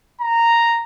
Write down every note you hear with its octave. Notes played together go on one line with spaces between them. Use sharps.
A#5